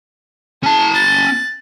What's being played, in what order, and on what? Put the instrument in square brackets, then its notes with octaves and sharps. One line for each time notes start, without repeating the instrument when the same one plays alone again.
[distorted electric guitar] C#4 A5 [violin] G#4
[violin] F#6 A6